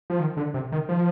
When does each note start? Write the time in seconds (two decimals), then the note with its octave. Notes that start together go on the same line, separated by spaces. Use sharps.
0.10 F3
0.20 D#3
0.37 D3
0.54 C3
0.72 D#3
0.89 F3